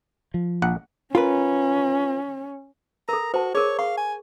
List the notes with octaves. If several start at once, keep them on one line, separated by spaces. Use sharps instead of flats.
F3
A#1 F#5
C#4 F4 A#4 B4
A4 A#4 A#5
F#4 C5 A5
G#4 A#4 C#5
F5 C#6
G#5